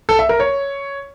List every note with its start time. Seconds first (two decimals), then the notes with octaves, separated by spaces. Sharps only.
0.09 A4
0.19 E5
0.29 A#4
0.40 C#5